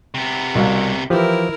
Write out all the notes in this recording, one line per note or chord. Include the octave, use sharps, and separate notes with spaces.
C3 B3
C2 B2 F5
E3 F3 E4 G4 A#4